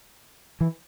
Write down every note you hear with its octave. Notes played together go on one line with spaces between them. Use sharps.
E3